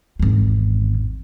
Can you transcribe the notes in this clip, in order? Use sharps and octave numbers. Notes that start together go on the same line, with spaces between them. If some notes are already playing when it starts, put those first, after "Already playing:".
G#1 E2